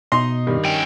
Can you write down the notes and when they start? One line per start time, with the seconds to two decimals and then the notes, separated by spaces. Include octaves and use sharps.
0.12 B2 D#4 D#5 C6
0.47 G2 D#3
0.65 C#4 G5